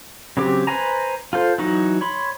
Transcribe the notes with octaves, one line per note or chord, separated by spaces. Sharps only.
C#3 F#3 C4 G4 D6
B4 C5 G#5 A#5
F4 A4 C5
E3 F#3 D#4 F#4
C#5 B5 C6